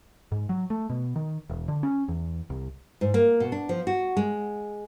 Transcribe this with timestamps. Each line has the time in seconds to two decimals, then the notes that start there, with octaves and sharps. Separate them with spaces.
0.32 G#2
0.49 F#3
0.70 A3
0.90 B2
1.16 D#3
1.50 E1
1.68 D3
1.83 C#4
2.08 E2
2.50 C2
3.01 G#2
3.14 A#3
3.40 B2
3.52 D4
3.69 F3
3.87 F#4
4.17 G#3